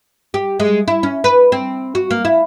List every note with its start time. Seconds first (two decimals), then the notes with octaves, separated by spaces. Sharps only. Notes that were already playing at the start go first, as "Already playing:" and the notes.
0.34 G4
0.60 G#3
0.88 E4
1.03 C#4
1.24 B4
1.52 C4
1.95 F#4
2.11 A#3
2.25 E4